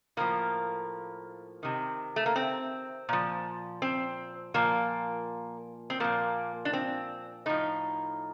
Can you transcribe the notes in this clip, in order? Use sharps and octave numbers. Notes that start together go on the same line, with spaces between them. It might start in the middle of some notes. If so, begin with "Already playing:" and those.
A2 F3 A#3
C3 D#3
A3
A#3
C4
A#2 F3
C4
A#2 F3 A#3
C4
A#2 F3 A#3
D4
C4
A2 F3 D#4